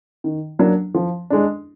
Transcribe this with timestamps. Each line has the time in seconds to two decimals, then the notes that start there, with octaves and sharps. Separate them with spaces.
0.24 D#3
0.59 F#3 A#3 D4
0.95 F3
1.30 G#3 D4